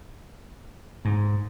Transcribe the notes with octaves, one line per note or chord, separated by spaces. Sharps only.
G#2